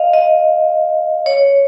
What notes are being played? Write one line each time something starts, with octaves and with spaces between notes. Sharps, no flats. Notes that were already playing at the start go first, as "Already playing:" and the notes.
Already playing: D#5 F5
D#5
C#5